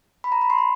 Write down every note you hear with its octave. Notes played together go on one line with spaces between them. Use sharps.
B5
A#5
B5
C6
B5